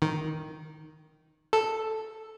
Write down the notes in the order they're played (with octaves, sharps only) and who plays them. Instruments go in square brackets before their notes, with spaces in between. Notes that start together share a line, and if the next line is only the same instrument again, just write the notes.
[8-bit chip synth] D#3
A4